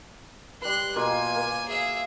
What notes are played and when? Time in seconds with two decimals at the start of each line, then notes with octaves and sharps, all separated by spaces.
0.62 G3 B4 C6 F#6
0.96 B2 A#3 F4 G#5
1.35 A#3
1.69 G#4 E5